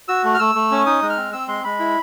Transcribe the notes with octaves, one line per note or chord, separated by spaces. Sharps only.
F#4 E6
A3
F6
A3 E6
A3
C#4
D#4 D#6
G#3
F6
C4
C4 E6
G#3 C6
G#3 B5
E4